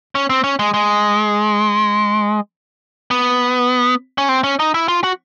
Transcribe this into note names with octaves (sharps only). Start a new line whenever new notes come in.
C#4
C4
C#4
G#3
G#3
B3
C#4
C4
C#4
D#4
E4
F4
F#4